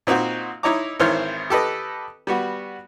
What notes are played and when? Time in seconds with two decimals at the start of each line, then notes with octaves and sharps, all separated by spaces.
0.07 A#2 C4 D#4 F#4 C5
0.63 D#4 E4 C#5 D#5 A#5 D6
1.00 G#1 D#3 E3 C5 C#5 F6
1.50 G4 A4 B4 D#5
2.27 G3 B3 F#4